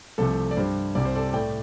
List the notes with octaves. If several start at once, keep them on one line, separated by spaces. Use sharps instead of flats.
C2 C3 F3 A3 A4
D5
G2 G3 C5
C2 C3 G3 D5
C5
A4 D5
A2 A3 D5 G5